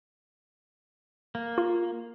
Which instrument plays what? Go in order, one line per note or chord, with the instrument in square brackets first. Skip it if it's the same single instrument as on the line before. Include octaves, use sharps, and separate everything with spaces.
[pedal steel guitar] A#3
[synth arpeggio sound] F4